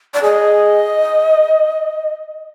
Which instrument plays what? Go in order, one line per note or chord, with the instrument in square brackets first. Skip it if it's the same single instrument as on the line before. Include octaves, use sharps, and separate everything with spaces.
[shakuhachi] D5
[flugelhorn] G#4 [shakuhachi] D#5